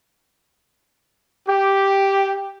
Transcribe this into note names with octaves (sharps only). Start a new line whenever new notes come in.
G4